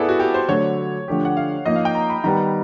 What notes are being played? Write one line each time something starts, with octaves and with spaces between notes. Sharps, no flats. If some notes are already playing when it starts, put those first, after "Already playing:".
Already playing: B3 E4 G#4 A4 B4 D5
F#4
G4
C5
D3 F#3 A3 D4 C#5
D3 F3 A3 D4 G4
F#5
F5
F3 A#3 D#4 D#5
F5
G5
A#5
B5
D#3 G3 B3 A#5